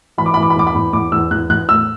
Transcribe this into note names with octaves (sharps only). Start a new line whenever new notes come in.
E3 B5
D6
B5
E3
D6
B5
E2 D6
B5
E2
E2 D6
E2 E6
E2 F#6
E2 F#6
A2 E6